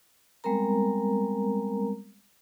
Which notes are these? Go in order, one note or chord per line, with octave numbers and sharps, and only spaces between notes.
G3 G#3 B3 C4 A#4 A#5